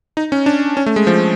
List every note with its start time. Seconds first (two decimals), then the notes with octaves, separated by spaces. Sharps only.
0.17 D#4
0.32 C#4
0.46 D4
0.77 C#4
0.86 A3
0.96 G#3
1.07 F3